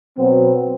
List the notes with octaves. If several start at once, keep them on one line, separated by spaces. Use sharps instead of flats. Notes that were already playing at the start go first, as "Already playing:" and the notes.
B2 F#3 B3 C4